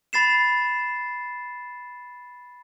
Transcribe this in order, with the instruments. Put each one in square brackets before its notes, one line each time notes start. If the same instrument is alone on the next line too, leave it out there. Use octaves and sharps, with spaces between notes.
[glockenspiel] B5 A6 C7 E7